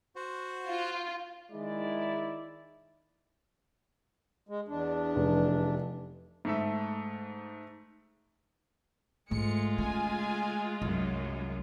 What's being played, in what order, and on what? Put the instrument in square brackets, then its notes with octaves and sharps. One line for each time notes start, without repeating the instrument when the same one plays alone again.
[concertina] F#4 C5 F#5
[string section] F4
[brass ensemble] D#3 E4 D5 [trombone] G#3
[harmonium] G#3
E2 D4
[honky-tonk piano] F1
[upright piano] G#2 A3 E5
[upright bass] G#2 [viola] G#3 F4 [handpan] A3 [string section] C#7
[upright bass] C#3 [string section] G#5
[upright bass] C2 [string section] F#2